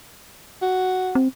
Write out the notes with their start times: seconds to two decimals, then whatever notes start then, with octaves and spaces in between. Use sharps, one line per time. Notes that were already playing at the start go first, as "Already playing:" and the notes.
0.62 F#4
1.15 C4